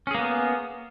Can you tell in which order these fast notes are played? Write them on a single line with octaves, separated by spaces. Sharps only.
C#4 G#4 A#3 B3